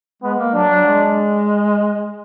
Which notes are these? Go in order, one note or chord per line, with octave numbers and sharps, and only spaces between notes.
G#3 B3
A#3
F#3 D4
F#3
G#3